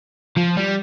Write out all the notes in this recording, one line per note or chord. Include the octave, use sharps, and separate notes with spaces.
F3
G3